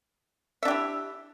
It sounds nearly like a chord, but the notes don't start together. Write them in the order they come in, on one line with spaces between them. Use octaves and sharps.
E5 D4 G4 E4